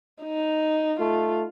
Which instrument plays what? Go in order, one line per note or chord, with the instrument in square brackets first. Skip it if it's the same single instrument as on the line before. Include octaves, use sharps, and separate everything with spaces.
[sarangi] D#4
[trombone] A3 [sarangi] F4